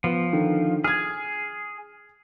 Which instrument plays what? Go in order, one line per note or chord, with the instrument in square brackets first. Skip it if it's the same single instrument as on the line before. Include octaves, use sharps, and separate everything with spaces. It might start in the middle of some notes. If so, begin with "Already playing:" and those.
[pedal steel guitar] F3 [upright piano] B3
[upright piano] D3 D#3
[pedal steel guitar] G#4 [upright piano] F6 G#6